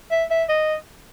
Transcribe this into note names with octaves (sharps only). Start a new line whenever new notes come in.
E5
E5
D#5